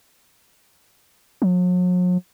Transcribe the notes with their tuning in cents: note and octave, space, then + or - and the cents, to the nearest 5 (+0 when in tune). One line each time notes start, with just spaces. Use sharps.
F#3 -45